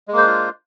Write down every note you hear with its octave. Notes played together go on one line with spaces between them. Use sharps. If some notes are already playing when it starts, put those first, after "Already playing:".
G#3 A#3 D4 F4 C5